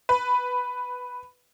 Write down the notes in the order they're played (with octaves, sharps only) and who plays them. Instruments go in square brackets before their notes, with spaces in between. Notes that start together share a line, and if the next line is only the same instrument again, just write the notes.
[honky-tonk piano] B4